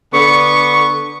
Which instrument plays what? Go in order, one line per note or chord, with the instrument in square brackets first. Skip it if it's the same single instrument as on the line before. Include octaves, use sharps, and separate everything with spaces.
[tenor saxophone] D3 [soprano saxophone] B3 [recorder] C#6